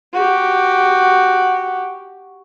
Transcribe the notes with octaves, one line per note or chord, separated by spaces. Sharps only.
F#4 G4